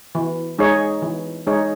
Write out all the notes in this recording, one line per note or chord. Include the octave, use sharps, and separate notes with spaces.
E3
G#3 D#4 G#4 C#5
E3
G#3 D#4 G#4 C#5